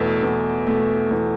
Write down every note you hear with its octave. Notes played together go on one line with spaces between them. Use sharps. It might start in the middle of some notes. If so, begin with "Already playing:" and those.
Already playing: E2 B2 A3
E2
B2 A3
E2